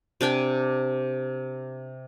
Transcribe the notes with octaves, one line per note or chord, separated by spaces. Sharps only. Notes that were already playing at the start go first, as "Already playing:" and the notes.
C3 D4 G5 G#5